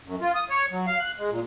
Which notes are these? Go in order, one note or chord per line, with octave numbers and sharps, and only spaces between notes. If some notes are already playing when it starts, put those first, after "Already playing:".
F#2
F4
D#6
C#5
F#3
F5
F#6
G#3
A#2